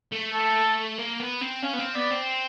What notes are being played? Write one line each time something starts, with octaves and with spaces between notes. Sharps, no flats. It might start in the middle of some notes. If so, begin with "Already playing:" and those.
A3
A4
A#3
B3
C4
C#4 F5
B3
C4
B3 D5
C4